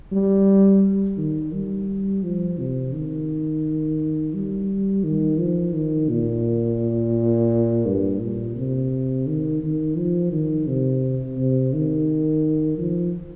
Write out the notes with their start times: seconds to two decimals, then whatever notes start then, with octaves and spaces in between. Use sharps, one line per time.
0.12 G3
1.17 D#3
1.53 G3
2.23 F3
2.58 C3
2.93 D#3
4.34 G3
5.04 D#3
5.39 F3
5.75 D#3
6.10 A#2
7.86 G2
8.20 A#2
8.56 C3
9.26 D#3
9.62 D#3
9.97 F3
10.32 D#3
10.67 C3
11.37 C3
11.73 D#3
12.78 F3